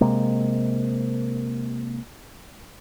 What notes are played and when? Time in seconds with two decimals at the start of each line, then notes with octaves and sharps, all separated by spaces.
0.01 C3 G#3 A#3